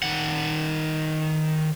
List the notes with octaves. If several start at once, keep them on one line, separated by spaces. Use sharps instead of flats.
D#3 F#5